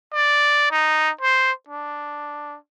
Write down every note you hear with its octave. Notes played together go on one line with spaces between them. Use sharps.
D5
D#4
C5
D4